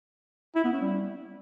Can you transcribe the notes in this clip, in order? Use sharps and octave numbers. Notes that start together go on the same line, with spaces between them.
E4
B3
C#4
G3